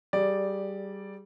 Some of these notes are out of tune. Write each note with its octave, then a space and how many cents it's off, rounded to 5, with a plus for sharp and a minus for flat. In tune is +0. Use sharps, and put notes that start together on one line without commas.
G3 -15 G#4 +0 D5 +0